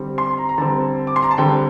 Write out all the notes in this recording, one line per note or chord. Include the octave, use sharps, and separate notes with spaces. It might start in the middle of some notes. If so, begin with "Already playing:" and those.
Already playing: D3 G3 C4
C6
A#5
A#5
D3 G3 C4 A5
D6
C6
A#5
A5
D3 G3 C4 G5